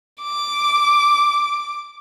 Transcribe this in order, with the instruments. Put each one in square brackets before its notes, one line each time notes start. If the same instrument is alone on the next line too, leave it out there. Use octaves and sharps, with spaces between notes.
[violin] D6